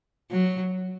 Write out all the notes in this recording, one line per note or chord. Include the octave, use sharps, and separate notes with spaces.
F#3